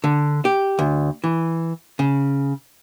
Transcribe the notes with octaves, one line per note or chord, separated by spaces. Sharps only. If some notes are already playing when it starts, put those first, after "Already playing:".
D3
G4
D2
E3
C#3